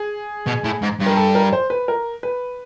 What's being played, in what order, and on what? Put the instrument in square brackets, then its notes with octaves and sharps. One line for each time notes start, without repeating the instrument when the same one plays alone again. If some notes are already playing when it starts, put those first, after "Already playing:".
Already playing: [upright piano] G#4
[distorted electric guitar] B2
A2
G#2
G2
[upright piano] A#4
A4
A#4
C5
B4
A#4
B4